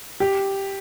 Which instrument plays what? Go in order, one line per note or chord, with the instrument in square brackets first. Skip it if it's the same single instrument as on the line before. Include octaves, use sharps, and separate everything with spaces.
[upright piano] G4